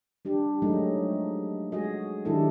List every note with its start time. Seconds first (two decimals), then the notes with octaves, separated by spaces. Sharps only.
0.25 G3 D4 G4
0.62 F3 F#3 G#3 A3 D#4
1.72 G#3 F#4 G#4 D#5
2.25 D#3 F#3 G3 D4 E4 A4